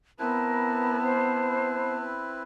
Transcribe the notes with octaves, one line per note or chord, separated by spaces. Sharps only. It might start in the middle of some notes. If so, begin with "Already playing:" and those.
B3 C4 E4 A#4 B4 A5
C5